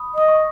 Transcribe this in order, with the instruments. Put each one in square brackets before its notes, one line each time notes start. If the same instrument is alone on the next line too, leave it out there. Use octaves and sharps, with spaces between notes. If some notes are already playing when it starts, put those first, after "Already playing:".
Already playing: [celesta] B5 D#6
[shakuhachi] D#5 [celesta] D#6
[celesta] C#6